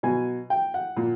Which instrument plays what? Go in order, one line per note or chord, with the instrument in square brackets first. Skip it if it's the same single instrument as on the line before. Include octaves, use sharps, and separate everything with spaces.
[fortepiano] B2 F#3 G#5
G5
F#5
A#2